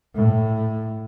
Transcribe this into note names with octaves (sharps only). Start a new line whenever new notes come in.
A2